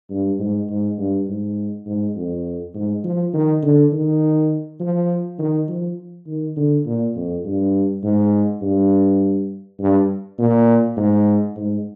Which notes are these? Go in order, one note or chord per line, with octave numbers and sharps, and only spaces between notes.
G2
G#2
G#2
G2
G#2
G#2
F2
G#2
F3
D#3
D3
D#3
F3
D#3
F3
D#3
D3
A#2
F2
G2
G#2
G2
G2
A#2
G#2
G#2